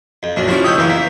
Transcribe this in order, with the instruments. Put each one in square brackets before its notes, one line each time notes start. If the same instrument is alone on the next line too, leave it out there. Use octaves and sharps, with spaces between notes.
[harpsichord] F2
[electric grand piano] A#1 [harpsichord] F#2 D4
[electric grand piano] F3 C#4 [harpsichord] E4 F#4 D6
[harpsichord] C#2 C#5 G5 [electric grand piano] D#6 E6 G6
[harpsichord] F#2 A#3 [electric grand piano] E3
[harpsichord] A#3 [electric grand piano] B6